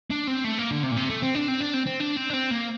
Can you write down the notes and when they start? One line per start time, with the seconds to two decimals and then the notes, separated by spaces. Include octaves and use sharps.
0.10 D4
0.27 C4
0.44 A3
0.58 A#3
0.71 D3
0.83 C3
0.91 A#2
0.96 C3
1.09 A3
1.22 C4
1.35 D4
1.48 C4
1.61 D4
1.74 C4
1.87 C4
2.00 D4
2.17 C4
2.30 D4
2.34 C4
2.51 A#3